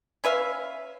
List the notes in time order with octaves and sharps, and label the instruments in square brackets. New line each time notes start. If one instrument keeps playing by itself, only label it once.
[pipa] C#4 B4 E5 F5